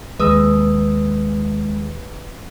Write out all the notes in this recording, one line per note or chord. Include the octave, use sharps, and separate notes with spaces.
D#2 G#3 B4 D#6 E6